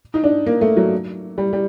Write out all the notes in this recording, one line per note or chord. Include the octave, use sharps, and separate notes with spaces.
D#4
D4
A#3
A3
F#3
G3
G3